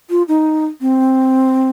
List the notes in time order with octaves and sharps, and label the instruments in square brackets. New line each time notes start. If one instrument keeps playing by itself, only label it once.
[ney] F4
D#4
C4